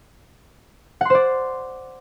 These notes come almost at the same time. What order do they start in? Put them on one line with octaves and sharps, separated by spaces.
F#5 C6 C5 D5